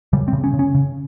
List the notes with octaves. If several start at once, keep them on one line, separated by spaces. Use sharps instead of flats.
C#3 G3
C4
C#3
C#4
C#3
C#4
C#3